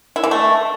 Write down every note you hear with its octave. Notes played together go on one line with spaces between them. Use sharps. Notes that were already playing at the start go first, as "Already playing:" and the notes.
E4
E3
A3